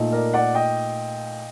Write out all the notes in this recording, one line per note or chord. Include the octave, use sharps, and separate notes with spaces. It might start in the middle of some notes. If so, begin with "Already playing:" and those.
Already playing: A#2 A3 D#4
A#4 D5
D5 F#5
D#5 G5